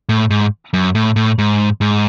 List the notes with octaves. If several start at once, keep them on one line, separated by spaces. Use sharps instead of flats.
A2
G#2
F#2
A2
A2
G#2
G#2